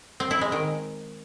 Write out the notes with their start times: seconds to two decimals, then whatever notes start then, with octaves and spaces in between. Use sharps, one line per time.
0.20 C4
0.31 E4
0.41 G#3
0.52 D#3